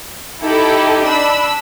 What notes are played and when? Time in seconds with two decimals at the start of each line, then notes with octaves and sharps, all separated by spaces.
0.42 D#4 E4 G4 A4
1.04 D4 B5 E6